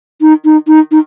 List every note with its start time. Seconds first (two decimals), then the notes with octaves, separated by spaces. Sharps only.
0.21 D#4
0.45 D#4
0.67 D#4
0.91 D#4